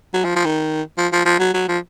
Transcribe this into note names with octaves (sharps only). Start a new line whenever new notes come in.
F#3
F3
F3
D#3
F3
F3
F3
F#3
F#3
F3